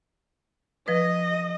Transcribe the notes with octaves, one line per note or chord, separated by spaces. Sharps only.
F3 B4 D#5